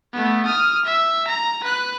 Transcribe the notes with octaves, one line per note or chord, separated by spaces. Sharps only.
A3 B3
D#6 F6
E5
A#5
B4 F#6